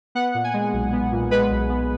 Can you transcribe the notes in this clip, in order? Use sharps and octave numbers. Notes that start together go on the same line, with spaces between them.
B3 F#5
A#2
G#5
G#3
B1
B3
A#2
G#3 B4
B1
B3